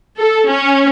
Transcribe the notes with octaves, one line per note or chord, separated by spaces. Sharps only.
A4
C#4